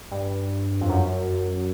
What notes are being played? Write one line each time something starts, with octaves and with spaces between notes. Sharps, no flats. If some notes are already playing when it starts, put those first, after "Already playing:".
G2
F2
F#2